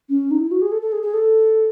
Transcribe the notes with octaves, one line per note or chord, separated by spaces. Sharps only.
C#4
D#4
E4
F#4
G#4
A4
A4
G#4
G#4
A4